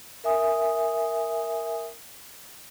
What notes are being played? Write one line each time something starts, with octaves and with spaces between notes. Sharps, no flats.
A#4 E5 G#5 D#6